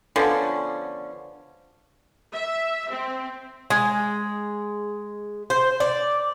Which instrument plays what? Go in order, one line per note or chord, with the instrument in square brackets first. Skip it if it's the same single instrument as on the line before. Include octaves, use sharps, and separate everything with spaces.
[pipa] D3 F3 B3 C#4
[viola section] E5
C4
[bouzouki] G#3
C5
D5